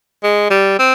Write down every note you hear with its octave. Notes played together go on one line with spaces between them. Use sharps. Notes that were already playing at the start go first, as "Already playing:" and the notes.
G#3
G3
C4